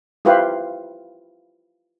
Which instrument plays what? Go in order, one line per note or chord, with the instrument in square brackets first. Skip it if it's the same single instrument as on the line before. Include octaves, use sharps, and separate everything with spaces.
[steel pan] E4 F4 G4 B4 C5 F5